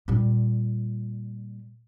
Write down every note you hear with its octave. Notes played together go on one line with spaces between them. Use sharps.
A#2 G3